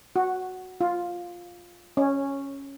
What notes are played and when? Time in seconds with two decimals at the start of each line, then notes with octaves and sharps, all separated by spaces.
0.16 F#4
0.81 F4
1.97 C#4